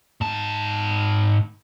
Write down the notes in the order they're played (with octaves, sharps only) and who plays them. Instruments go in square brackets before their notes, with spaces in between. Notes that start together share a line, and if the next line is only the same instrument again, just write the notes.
[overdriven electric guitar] G#2 A5